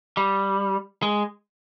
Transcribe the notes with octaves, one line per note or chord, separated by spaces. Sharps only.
G3
G#3